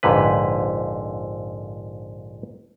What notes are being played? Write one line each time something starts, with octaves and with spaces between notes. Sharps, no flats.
A#1 F2 G#2 D3 B4